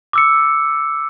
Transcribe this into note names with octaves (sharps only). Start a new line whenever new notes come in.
D6 E6 C#7